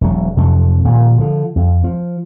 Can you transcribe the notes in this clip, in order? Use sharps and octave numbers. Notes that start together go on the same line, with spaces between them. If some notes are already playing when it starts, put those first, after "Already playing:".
E1 F#3
F2 C3 F3 F#3
A#2 D#3 F3
D3 E3 F3
F2
F3